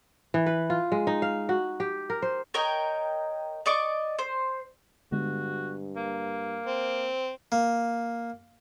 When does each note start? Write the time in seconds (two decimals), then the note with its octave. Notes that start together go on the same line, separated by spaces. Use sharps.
0.34 E3
0.46 B4
0.70 F4
0.92 G#3
1.07 D#4
1.22 F5
1.49 F#4
1.80 G4
2.10 A#4
2.22 C5
2.54 A#4 C#5 D#5 G5
3.66 D5 D#5 C#6 D6
4.19 C5
5.12 G2 D3 G#3 B3 F#4
5.96 A#3
6.66 C4
7.52 A#3